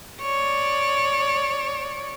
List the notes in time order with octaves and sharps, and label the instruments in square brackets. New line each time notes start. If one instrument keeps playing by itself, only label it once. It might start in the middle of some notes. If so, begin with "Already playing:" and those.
[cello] C#5 D5